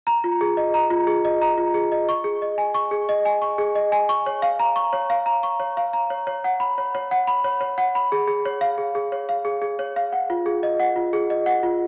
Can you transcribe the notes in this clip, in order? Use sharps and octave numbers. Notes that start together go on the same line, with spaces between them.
A#5
F4
G#4
D#5
A#5
F4
G#4
D#5
A#5
F4
G#4
D#5
C#6
G#4
D#5
G#5
C#6
G#4
D#5
G#5
C#6
G#4
D#5
G#5
C#6
C#5
F5
A#5
C#6
C#5
F5
A#5
C#6
C#5
F5
A#5
C#5
C#5
F#5
B5
C#5
C#5
F#5
B5
C#5
C#5
F#5
B5
G#4
G#4
C#5
F5
G#4
G#4
C#5
F5
G#4
G#4
C#5
F5
F#5
F4
G#4
D#5
F#5
F4
G#4
D#5
F#5
F4